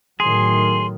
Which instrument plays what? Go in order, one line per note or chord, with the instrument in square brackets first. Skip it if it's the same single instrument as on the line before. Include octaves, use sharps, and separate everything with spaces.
[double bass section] A2 D#3 F#3 [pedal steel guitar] G#4 [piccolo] C6